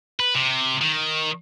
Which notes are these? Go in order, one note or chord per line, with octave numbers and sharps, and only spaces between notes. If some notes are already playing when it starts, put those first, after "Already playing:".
B4
C3
D#3